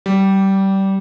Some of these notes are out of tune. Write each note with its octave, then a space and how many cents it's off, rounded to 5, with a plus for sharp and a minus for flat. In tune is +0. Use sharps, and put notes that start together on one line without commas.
G3 -20